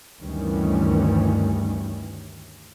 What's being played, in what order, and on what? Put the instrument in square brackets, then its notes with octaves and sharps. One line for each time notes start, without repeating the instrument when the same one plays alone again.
[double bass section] D2 G2 D#3 E3 G3 C#4